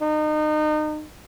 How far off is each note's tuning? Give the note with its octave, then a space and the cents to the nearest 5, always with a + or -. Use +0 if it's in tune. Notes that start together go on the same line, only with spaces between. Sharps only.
D#4 -30